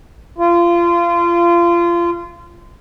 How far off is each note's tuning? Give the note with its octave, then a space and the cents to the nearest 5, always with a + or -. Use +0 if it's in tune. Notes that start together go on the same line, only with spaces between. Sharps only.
F4 -25